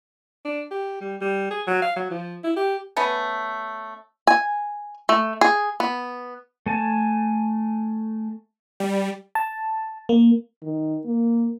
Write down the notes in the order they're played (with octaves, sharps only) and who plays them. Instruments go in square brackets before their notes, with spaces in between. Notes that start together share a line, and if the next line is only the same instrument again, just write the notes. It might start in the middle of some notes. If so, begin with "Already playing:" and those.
[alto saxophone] D4
G4
G3
G3
G#4
F#3
F5
F#3
F3
E4
G4
[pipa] A3 B3 C#4
[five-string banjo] G#5
A3
G#4
B3
[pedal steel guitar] A3 G#5 A5
[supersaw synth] G3
[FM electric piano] A5
A#3
[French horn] D#3
A#3